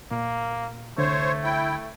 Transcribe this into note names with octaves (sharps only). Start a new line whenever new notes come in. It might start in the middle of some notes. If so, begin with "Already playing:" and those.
A#2 A#3
C2 D3 A3 C5 C#5
E4 G5